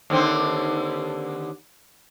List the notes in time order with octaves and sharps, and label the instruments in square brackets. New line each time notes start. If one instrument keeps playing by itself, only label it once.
[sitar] D#2 D3 C4